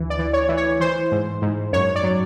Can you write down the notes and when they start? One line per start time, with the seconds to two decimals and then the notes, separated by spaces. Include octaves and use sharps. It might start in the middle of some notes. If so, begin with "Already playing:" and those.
Already playing: D2 E3
0.10 D5
0.19 E3
0.33 C#5
0.49 E3
0.57 C#5
0.80 E3 C5
1.12 G#2
1.42 G#2
1.73 F#2 C#5
1.96 D5
2.03 F#3